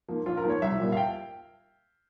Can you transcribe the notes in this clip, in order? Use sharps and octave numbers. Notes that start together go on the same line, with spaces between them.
G#2 F3 A#3
A#1 F4
A#4
G#2 F3 A#3
C#5
C2 E5
A#2 G3 A#3
F5
G5